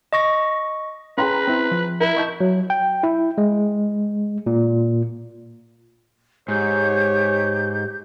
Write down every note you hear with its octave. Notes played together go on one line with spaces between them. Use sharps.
D#5 C#6 A#6
C#4 G#4 B4 G5 A#5 C6
C4 E4
F3
E4 A#4
D#5 A5 C#6 G6
F#3
G5
E4
G#3
A#2
G#2 G4 C#5 G6